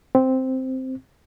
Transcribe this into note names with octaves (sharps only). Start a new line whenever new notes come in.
C4